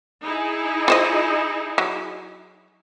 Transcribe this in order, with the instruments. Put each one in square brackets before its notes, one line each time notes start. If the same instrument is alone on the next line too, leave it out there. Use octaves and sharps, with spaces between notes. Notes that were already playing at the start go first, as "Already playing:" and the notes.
[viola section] D#4 E4 G#4
[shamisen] F4 C5 D#5
F#3